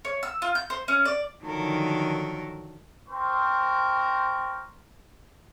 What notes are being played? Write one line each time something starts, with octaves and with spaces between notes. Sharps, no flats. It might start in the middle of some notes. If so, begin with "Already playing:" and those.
C#5
E6
F4
G6
C5
C#4
D5
D3 D#3 F3 F#3 A4 A#4
C4 A#4 C5 C#6